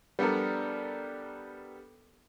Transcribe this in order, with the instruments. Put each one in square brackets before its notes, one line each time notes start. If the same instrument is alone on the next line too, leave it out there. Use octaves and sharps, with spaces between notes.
[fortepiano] G3 B3 D4 A4 A#4